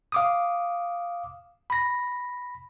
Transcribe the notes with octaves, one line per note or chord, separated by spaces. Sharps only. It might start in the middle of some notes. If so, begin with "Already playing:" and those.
F5 D6 D#6
B5 A#6